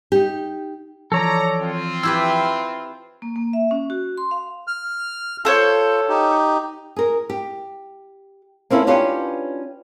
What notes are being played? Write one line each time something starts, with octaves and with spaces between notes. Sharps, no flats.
D#4 G4
E3 F3 A4 C#5 D5 A#5
C4 F4
E4 G4 B4 E6
A#3
A#3
E5
C#4
F#4
C6
F5
F6
F4 A4 C5 C#5
D#4 G4
G#4 A#4
G4
A#3 C4 C#4 E4 F4 A4
C#4 D4 F4 G4 B4 C#5